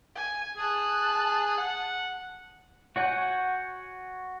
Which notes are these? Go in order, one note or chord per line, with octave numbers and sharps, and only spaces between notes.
G#5
G#4 A5 F#6
F#5
F#4 C#5 F#5 G#5 G6